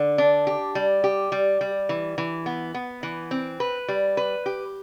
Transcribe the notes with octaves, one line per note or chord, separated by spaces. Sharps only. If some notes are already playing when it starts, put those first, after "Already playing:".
Already playing: D3
D4
G4
G3
G4
G3
G3
E3
E3
B3
B3
E3
C4
B4
G3
B4
G4